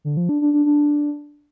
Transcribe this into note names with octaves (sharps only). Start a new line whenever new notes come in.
D3
F3
D4
D4
D4
D4